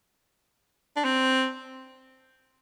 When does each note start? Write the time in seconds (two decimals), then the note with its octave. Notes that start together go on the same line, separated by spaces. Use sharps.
0.97 D4
1.05 C4